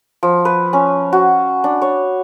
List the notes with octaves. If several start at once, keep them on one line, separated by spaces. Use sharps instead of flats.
F3
B4
C#4
F#4
D4
C#5